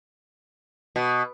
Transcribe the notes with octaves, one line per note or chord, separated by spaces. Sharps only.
B2